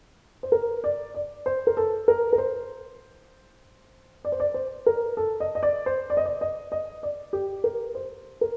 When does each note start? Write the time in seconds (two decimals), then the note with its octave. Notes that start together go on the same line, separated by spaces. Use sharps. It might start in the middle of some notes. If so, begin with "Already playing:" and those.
0.43 C5
0.52 A#4
0.84 D5
1.14 D5
1.46 C5
1.67 A#4
1.77 A4
2.08 A#4
2.33 A#4
2.38 C5
4.25 D5
4.32 C5
4.40 D5
4.54 C5
4.86 A#4
5.17 A4
5.40 D#5
5.55 D#5
5.63 D5
5.86 C5
6.10 D5
6.17 D#5
6.25 D5
6.41 D#5
6.72 D#5
7.03 D5
7.33 G4
7.64 A#4
7.95 C5
8.41 A#4